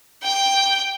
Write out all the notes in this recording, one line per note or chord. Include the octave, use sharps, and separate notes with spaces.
G5